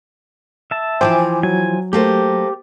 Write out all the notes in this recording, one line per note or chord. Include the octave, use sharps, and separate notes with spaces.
E5 A5
E3 F3 C5 G5 G#5 D6
F#3 G#5
A3 A#3 G4 C5